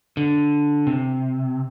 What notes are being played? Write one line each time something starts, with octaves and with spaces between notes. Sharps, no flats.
D3
C3